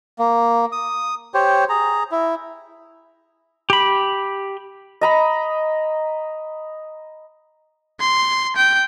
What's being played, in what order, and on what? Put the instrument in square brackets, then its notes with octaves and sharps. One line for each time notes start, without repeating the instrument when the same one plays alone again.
[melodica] A#3
D#6
G4 C5 C#5
G#4 A#5
E4
[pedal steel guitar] G4 B5
[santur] D#5 A#5 B5
[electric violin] C6
G5